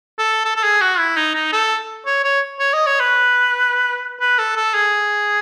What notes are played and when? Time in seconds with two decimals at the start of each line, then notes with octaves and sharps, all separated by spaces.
0.19 A4
0.45 A4
0.56 A4
0.64 G#4
0.81 F#4
0.99 E4
1.17 D#4
1.35 D#4
1.53 A4
2.06 C#5
2.24 C#5
2.60 C#5
2.73 D#5
2.87 C#5
3.00 B4
4.20 B4
4.39 A4
4.56 A4
4.74 G#4